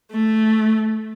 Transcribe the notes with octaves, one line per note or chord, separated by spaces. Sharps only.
A3